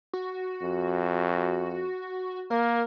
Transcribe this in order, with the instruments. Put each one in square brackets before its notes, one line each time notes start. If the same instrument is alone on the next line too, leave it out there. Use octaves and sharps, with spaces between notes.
[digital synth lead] F#4
[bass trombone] F2
[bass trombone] A#3 [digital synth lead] A#4